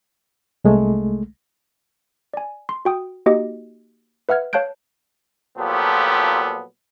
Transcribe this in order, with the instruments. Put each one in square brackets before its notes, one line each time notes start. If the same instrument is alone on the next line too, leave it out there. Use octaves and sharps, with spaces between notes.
[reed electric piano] C2 G#3 A3
[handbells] D5 G#5
C6
F#4 G5 D#6
A#3 D#4 F#4 G4 D#5
B4 E5 F#5 F6 G#6
C#5 F5 A5 F#6 G6 D7
[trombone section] A#2 F3 F#3 B3 G4 A4